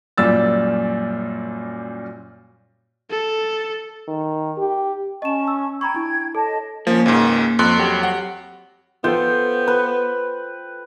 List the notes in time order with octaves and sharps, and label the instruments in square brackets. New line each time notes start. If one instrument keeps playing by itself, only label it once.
[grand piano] F#2 A#2 G3 E6 A6
[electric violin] A4
[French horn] D#3
G4
[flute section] C#4 A5 C#6 [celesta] D#5 E7
[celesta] E6
[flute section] G5 G#6 [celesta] A#5 B5 C#6
[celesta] D4 E4
[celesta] A4 [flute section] C#5 D#5 A5
[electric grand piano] F3 [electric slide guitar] A#3 C#4
[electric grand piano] C#2 G#2
F2 C6 F#6
[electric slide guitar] F#3 G4
[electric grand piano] F#5
[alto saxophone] B3 [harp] F4 A4 C5 [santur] G5
[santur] B4